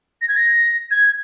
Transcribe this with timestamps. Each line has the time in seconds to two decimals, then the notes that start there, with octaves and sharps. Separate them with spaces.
0.21 A#6
0.28 G#6
0.36 A#6
0.91 G#6